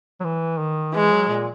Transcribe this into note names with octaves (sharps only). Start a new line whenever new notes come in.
F#3
E3
D#3
E3 G#3
F#3
A#2